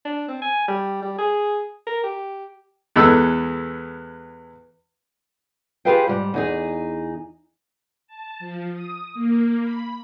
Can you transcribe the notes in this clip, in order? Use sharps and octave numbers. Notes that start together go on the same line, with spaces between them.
D4
C4
G#5
G3
G3
G#4
A#4
G4
E2 G#3 B3 A4 B5 E6
F4 G4 G#4 B4 F5 G5
G#2 G3
E2 D#4 G#4
A5
F3
D#6
A#3
B5